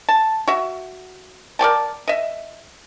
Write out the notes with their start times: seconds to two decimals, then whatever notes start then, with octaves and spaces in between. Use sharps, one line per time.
0.09 A5
0.47 F#4 E5
1.59 A#4 D5 G5 A5
2.08 D#5 E5